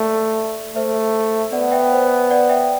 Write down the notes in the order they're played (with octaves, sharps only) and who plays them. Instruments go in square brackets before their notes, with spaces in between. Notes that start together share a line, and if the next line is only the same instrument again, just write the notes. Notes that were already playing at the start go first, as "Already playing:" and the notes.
Already playing: [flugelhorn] A3 [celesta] D5
[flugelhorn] A3 [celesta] C5 E5
[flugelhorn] B3 [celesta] D5 F#5
[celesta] E5 G5
C5
D5 F#5
E5 G5